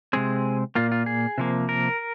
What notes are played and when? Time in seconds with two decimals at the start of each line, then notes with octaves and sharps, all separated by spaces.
0.13 C3 G#3 C4 G#4
0.75 A#2 A#3 F4
0.92 F4
1.06 G#4
1.38 C3 F3 A#3
1.69 A#4